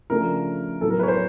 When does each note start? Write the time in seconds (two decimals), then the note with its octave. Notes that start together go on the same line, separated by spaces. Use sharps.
0.10 C#3 F3 A3 D4 A#4
0.81 A2 F#3 B3 A4
0.90 A#4
0.99 B4
1.03 C#5
1.08 C5